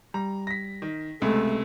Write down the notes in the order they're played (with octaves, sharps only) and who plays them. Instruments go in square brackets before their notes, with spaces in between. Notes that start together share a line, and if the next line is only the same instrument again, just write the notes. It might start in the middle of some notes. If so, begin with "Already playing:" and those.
[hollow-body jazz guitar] G3 [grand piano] A#5
[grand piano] A#6 B6
D#3
[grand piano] C#2 C3 [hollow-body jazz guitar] G#3 [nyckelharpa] A3